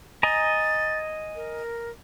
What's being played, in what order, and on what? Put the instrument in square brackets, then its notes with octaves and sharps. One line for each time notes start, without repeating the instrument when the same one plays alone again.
[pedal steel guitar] D#5 G#5 A#5 [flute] A6
[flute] A#4